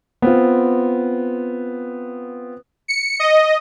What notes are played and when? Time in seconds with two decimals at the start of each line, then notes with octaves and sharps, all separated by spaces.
0.22 B3 C4 F4
2.88 C#7
3.20 D#5